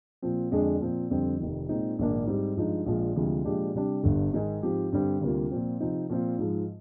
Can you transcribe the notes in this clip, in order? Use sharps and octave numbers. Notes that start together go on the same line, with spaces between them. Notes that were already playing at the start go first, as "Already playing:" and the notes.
A#2 F3 C4
F2 D3 G#3 D4 G#4
A#2 F3 C4
F2 D3 G3 C4
F1 F2 D#3
A#2 G#3 C4 D#4
A#1 G#2 D#3 A#3 D4
G#2 G3 C4 G4
G2 F3 G#3 D#4
A#1 A#2 F3 G#3
D2 C3 F3 G#3
A#2 F3 G#3 D4 G4
C3 G3 D4
G1 G2 D3
G#2 D#3 G#3 D#4 G#4
G#2 F3 C4 G4
G2 D3 G3 C4
D2 C3 G3 A#3 F4
A#2 F3 C4
C3 F3 C4 D#4
A#2 F3 C4 F4
G#2 F3 G#3